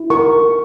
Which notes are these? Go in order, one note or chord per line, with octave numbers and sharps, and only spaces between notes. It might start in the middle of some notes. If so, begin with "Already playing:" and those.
Already playing: E4
A#4 C#6